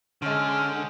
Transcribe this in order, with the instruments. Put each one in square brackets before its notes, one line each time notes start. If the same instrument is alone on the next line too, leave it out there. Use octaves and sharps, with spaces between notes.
[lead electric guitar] D3 [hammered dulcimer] G#3 C5 [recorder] C#4 [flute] F6